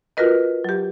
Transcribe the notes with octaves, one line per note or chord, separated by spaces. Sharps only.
F4 F#4 A#4 B4 D#5
F#3 G4